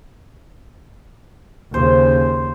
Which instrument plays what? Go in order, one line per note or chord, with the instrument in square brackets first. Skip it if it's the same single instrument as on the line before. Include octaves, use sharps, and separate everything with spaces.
[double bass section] D#2 C#3 [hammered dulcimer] C5